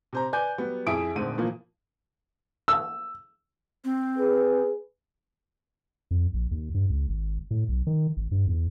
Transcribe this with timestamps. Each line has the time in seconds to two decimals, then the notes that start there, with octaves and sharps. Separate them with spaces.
0.13 C3 C5 A#5
0.33 B4 D5 G#5 G6
0.58 F#3 G3 B3
0.87 F2 E4 G#4 E5 D#6 D7
1.15 D#1 G#2 D3 A3 C4 D#7
1.38 A#2 E3 F3 A#3
2.68 E6
3.85 C4
4.18 G#4 B4
6.11 F2
6.34 A#1
6.51 D#2
6.74 G2
6.90 C#2
7.09 G#1
7.51 A2
7.69 B1
7.87 D#3
8.17 G#1
8.32 G2
8.47 E2